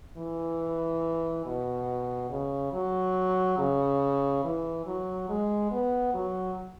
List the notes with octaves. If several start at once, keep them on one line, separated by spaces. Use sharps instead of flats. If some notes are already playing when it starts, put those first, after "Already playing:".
E3
B2
C#3
F#3
C#3
E3
F#3
G#3
B3
F#3